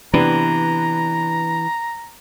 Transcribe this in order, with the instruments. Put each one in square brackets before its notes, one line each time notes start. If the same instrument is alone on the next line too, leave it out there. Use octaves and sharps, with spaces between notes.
[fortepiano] C3 B3 D4 [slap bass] E3 [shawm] A#5